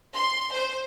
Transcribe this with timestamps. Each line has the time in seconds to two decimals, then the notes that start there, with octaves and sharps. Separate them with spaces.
0.14 C6
0.53 C5